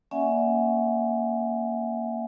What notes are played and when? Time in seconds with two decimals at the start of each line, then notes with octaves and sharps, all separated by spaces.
0.11 A#3 C#4 D5 E5 F#5 G#5